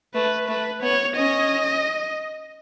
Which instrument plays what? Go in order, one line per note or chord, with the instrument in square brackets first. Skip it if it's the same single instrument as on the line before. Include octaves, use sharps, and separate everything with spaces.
[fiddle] A3 [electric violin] B4
[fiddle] A3 [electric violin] B4
[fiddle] B3 [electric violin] C#5
[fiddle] C#4 [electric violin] D#5